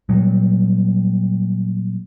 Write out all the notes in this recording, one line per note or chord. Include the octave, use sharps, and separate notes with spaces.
A#2 F#3 G3